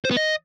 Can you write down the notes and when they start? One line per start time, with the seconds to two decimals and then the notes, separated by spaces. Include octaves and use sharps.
0.05 C5
0.11 B3
0.17 D#5